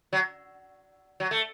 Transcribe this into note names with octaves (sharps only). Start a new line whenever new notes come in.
F#3
F#3
A3